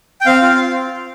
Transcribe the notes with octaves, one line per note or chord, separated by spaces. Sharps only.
G5
C4 F5
F4